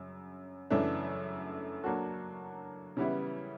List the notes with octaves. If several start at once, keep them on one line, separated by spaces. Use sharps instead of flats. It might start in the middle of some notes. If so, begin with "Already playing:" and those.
Already playing: F#2 C#3
F#2 C#3 E3 A3 D4
F#3 A#3 D4 F#4 A4
C#3 E3 G3 B3 E4